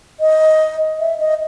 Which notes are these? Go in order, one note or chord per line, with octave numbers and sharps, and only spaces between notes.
D#5
E5
D#5